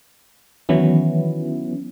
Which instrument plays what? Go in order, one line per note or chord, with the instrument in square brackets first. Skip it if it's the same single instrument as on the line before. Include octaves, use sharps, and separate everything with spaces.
[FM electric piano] D#3 E3 F#3 B3 C#4 E4